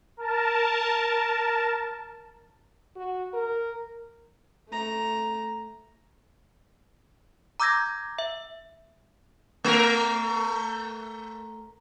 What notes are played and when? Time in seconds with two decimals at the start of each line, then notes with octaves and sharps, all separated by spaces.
0.17 A#4 A5
2.96 F#4
3.33 A#4
4.69 A3 A#5
7.60 A#5 D6 E6 G6 G#6 A#6
8.19 E5
9.64 A3 A#4